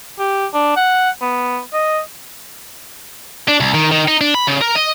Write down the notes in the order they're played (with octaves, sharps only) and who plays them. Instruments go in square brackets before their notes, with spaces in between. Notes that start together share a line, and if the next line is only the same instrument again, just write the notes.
[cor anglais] G4
D4
F#5
B3
D#5
[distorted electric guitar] D4
C2
D#3
D#3
D#4
D4
B5
C#3
A#4
D#5